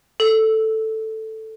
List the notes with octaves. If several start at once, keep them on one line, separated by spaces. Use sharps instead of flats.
A4